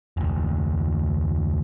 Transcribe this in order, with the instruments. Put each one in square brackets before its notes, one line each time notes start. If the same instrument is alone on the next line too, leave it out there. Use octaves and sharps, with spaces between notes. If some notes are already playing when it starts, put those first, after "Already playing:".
[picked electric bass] F1 D2